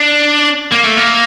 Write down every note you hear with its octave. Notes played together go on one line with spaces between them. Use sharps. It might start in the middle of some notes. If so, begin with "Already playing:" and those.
Already playing: D4
A#3
A3
A#3